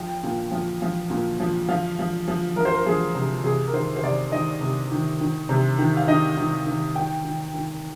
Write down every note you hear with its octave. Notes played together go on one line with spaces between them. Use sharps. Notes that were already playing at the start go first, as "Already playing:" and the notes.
Already playing: F3 G5
A#2
F3
F3
A#2
F3
F3 F5
F3
F3
F3 A#4
C5
A#4
F3 G#4
C3
C3 G#4
A#4
D#3 C5
C5
C3 D5
D#3 D#5
C3
D#3
D#3
C3
D#3
F5
D#3 D#5
D#3
D#3
D#3 G5
D#3
D#3